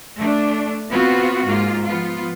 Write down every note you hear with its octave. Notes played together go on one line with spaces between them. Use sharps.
A3 D4
B3 C4 F4 F#4
G#2 A#3 F4
F3 B3 F4